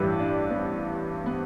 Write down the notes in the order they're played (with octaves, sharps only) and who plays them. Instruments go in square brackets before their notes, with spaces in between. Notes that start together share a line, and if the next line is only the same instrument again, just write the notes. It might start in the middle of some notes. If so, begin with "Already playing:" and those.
Already playing: [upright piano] A1 G2 G3 E4 B4 [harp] G4
[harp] D4
B3
B3